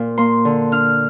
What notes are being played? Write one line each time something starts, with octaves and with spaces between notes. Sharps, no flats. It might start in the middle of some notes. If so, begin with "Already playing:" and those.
Already playing: A#2
A#3 C6
D3
D4 F6